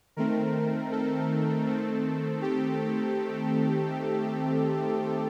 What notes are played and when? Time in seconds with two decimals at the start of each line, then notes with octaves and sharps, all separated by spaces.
0.17 D#3 A3 C4 A#4
0.92 A4
1.67 D#3 A3 C4
2.42 G4